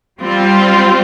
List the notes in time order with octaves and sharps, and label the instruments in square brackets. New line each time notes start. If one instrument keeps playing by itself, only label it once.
[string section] G3 C4 F4